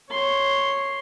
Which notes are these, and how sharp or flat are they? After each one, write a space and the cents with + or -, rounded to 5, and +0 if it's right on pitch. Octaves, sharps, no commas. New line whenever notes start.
C#5 -10 C6 +0